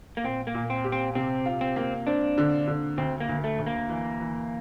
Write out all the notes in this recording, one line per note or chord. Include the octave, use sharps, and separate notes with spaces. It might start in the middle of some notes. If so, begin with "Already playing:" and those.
A#3
A#2 C4
A#3
A#2
C4
G4
C4
C3 C4
F4
C4
A#3
C4 D4
D3
D3
D2 C4
A#3
D2
A3
D2
A#3
E3
E3